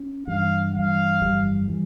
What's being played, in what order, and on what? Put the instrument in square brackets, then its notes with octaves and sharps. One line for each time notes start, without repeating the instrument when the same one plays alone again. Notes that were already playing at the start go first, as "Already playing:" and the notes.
Already playing: [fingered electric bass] C#4
[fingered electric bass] G2 E3 G3 [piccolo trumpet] F5
[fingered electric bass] G2 E3 G3 [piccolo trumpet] F5
[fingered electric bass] G1 F2 E3 G3
E3 G3